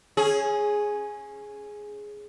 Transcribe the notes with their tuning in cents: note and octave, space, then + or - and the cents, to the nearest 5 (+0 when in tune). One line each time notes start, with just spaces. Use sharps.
C#4 -20 G#4 +5